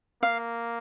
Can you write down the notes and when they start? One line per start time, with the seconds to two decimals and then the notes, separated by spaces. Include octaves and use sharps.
0.22 A#3 F5